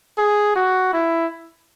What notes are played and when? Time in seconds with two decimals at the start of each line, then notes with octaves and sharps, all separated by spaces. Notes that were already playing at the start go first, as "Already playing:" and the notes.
0.18 G#4
0.56 F#4
0.93 E4